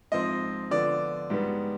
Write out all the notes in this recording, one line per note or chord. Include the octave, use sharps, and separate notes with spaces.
G#2 F3 C4 D#5
D3 F3 B3 D5
G#2 G3 B3